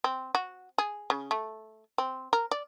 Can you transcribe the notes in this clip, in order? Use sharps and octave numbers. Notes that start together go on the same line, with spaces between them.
C4
F#4
G#4
C#3
A3
C4
A#4
D5